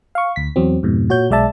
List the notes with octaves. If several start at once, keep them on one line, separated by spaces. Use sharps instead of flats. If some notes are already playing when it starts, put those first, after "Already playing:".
F5 C#6
D2 B6
E2 F#3 C4
F2 G#2 B2
A#2 F#4 C#5 G6
B1 G#3 D5 E5 A5